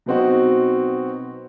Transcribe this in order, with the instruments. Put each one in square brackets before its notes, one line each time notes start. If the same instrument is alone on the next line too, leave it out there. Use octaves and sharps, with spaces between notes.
[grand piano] B2 F#3 B3 C4 D#4 F#4